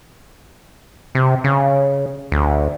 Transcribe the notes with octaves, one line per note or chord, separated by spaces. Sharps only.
C3
C#3
D2